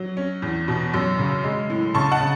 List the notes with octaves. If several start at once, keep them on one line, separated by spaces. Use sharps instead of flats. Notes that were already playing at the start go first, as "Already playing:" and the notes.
Already playing: F#3
C#4
E2
B2
F#2
C#3
G#3
A2
C#3 A5 C#6
F#5 A5
C#3